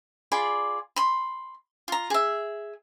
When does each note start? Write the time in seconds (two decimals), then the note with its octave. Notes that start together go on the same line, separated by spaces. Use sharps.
0.32 F4 G#4 D5 B5
0.96 B5 C6
1.88 F4 A#5
2.10 G#4 E5